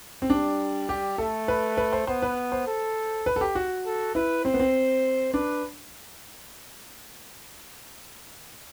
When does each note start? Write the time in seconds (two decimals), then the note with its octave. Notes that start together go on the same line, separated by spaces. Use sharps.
0.22 C4
0.30 G3 D4
0.89 G4
1.18 A3 A4
1.48 B4
1.77 B4
1.93 C5
2.07 B3 C5
2.22 B4
2.52 C5
2.67 A4
3.26 B4
3.36 A4
3.41 G4
3.55 F#4
3.86 A4
4.15 E4 B4
4.45 C4 C5
4.54 B3
4.60 C4
5.33 D4 B4